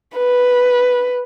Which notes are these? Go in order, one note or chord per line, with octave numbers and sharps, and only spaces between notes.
B4